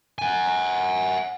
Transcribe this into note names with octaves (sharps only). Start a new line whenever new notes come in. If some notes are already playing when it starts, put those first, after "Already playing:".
F#5 G#5